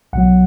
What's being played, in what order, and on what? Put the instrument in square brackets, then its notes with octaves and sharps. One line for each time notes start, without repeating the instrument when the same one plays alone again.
[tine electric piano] B1 B2 F#3 F#5